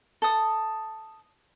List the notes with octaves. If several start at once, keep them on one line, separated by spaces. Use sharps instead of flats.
A4 D#6